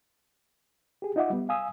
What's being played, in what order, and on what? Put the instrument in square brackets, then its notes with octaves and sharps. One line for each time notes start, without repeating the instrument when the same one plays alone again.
[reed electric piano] G4 G#4
D#4 F4 D#5 E5 F#5 D6
G3 B3
F5 G#5 D#6 E6